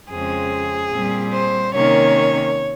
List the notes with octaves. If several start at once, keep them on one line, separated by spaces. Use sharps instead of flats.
F2 C#3 G#3 C4 G#4
A#2 G3 C4
C5
C3 D#3 A#3 C#4 C#5